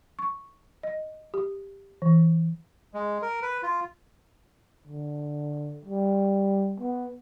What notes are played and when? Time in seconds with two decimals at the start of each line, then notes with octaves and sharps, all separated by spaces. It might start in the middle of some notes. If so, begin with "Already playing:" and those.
0.19 C#6
0.83 D#5
1.34 G4
2.02 E3
2.94 G#3
3.22 A#4
3.42 B4
3.63 F4
4.87 D3
5.85 G3
6.80 B3